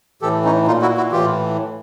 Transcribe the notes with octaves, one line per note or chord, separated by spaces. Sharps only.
A2 E3 G4 A4
C#4 D#4
A#2 D#4 F4
E4 F#4
E4 F#4
A2 E3 F4 G4